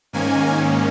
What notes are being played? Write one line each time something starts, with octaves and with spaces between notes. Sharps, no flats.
G#2 D#3 A#3 C#4 G#5